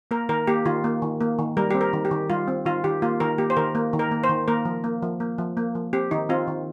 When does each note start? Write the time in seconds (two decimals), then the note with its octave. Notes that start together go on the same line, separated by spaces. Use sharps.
0.11 A#3 A#4
0.29 D#3 A#4
0.47 A#3 G4
0.65 D#3 F4
0.84 A#3
1.02 D#3
1.21 A#3
1.39 D#3
1.57 G3 A#4
1.71 C4 G4
1.81 A#4
1.93 D#3
2.05 G4
2.11 D#3
2.29 G3 F4
2.48 C4
2.65 D#3 F4
2.84 D#3 G4
3.02 A#3 F4
3.20 D#3 A#4
3.38 A#3 G4
3.50 C5
3.57 D#3 A#4
3.75 A#3
3.93 D#3
3.99 A#4
4.11 A#3
4.24 C5
4.29 D#3
4.48 A#3 A#4
4.65 F3
4.84 A#3
5.03 F3
5.20 A#3
5.38 F3
5.57 A#3
5.75 F3
5.93 C4 G4
6.11 D#3 D#4
6.29 C4 F4
6.48 D#3